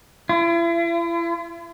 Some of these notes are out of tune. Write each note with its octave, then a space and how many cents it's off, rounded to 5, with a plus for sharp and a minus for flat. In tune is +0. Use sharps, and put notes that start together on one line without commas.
E4 +40